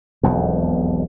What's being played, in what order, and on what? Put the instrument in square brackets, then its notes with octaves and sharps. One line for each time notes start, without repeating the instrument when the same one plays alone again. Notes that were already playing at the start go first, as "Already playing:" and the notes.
[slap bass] E1 B1 F2